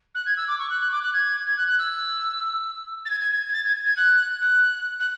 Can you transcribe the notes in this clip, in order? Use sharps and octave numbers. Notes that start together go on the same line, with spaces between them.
F#6
G#6
E6
D6
C#6
F#6
F#6
D6
F#6
G#6
G#6
F#6
F#6
E6
A6
G#6
G#6
G#6
G#6
A6
G#6
G#6
F#6
F#6
F#6